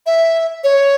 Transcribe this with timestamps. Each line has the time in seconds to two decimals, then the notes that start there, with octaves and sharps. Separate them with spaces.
0.06 E5
0.64 C#5